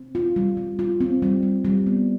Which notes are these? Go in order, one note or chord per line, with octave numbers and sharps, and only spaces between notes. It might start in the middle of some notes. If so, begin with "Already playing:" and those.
Already playing: C4
F4
G3
G3
F4
C4
G3
G3
G3
B3